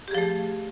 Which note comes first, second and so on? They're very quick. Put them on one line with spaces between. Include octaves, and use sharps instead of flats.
G4 G#4 F3 A3